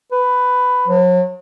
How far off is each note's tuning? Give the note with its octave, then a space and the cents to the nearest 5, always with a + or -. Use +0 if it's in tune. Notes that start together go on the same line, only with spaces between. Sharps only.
B4 +10
F#3 -40